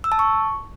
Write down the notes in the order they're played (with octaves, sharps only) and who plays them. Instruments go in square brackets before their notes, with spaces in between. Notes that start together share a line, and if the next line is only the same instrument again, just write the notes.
[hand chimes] E6
A5
C#6